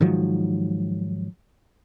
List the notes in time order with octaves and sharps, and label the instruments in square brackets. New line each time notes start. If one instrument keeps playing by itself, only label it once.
[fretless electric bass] G#2 D#3 F3 F#3